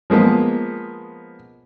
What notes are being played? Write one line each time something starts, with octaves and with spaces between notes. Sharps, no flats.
F3 G#3 A#3 B3